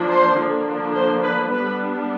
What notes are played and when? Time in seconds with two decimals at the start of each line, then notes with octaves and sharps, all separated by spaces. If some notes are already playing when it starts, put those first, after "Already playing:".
Already playing: F3 A#3 D4
0.09 C5
0.38 D3 F3 A#3 D4
0.95 C5
1.23 B4
1.52 G3 B3 D4 B4